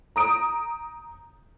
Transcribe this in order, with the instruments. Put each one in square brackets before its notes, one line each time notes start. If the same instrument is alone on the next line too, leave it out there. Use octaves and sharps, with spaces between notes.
[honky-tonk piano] A#5 D#6 D7